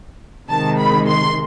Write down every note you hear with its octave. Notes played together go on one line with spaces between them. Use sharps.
C3 D#3 G#3 A5
B5
C6